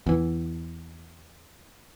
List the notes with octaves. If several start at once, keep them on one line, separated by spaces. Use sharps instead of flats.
E2 E3